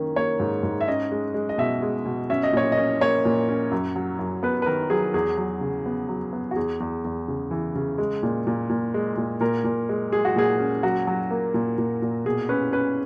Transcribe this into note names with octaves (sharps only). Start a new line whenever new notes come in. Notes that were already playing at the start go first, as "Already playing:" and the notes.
Already playing: D#3 A#3 C#4
A#3 C#5
G#2
G#2
E5
C#4 D#5
G#3
G#3
D#5
B2 E5
G#3
B2
C#4 E5
D#5
A#2 C#5
D#5
C#4
A#3 C#5
A#2
C#4
F#2
F#3
F#2
B3 B4
B4
D#3 A#4
F#3 G#4
E2 G#4
F#3
C#3
B3
F#3
B3
F#4
E2 G#4
E2
E2
C#3
E3
C#3
G#3
A#2
A#2
A#2
G#3
A#2
A#2 A#4
A#2
G#3
G#3 G#4
F#4
A#2 G#4
C#4
F#3 F#4
F#3
A#3
A#2
A#2
A#2
B2 G#4
C#4 B4
C#4 B4